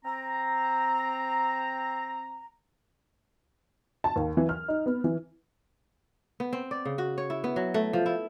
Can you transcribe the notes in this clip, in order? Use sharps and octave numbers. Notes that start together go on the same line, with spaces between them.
C4 A#5
A5
D#2
E3
F6
D#4
B3
E3
B3
C4
D5
C#3
F#4
C#5
E4
B3
F#3
A3
F3
E4